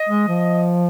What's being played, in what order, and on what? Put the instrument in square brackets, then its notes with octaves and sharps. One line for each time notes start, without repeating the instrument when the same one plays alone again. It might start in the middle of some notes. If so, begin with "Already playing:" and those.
Already playing: [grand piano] D#5
[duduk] G#3
F3